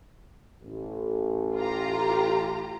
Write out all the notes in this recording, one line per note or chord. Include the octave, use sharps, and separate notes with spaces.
A1
F4 G4 A#5